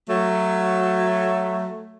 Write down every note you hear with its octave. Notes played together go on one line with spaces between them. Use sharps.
F#3 A3